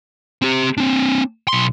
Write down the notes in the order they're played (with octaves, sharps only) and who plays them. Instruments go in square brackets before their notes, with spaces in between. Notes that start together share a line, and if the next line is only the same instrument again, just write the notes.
[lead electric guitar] C4 G4
C4 D4
B1 C6